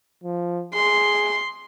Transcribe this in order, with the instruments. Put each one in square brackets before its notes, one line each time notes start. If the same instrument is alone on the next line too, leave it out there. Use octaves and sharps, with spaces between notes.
[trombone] F3
[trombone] G#4 [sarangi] C6